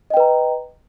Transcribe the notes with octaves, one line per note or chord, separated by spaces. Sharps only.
B4 D#5 G5 A#5